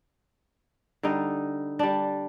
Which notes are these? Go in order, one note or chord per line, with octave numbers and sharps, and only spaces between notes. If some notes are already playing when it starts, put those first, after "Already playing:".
D3 G3 D#4
G3 D4